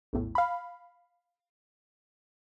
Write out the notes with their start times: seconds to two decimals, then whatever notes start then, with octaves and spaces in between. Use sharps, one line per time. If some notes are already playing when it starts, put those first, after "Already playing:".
0.13 A#1 E2 A2
0.35 F5 B5